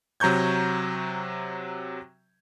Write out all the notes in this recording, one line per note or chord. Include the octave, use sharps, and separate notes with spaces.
C3 F#3 A#5 C#6 G6 G#6